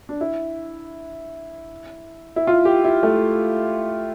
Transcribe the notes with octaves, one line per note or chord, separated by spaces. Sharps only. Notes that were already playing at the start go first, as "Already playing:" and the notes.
D4
E4
E4
F4
G4
E4
A3